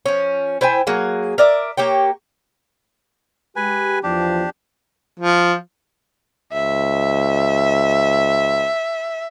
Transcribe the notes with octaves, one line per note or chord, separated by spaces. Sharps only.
F3 C#4
E4 C5 G5 G#5
F#3 A#3 G#4
A#4 D5 E5
A#3 G4 C#5 G5
G#3 G4 B4 G#5
E2 E3 F3 D4 G4
F3
C#2 E5